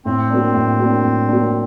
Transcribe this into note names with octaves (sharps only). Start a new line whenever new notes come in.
A2 C4
F#3 A#3 D4
A2
F#3 A#3 D4
A2
F#3 A#3 D4